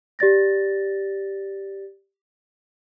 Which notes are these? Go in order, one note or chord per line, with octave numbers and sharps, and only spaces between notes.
G4 D5 A6 A#6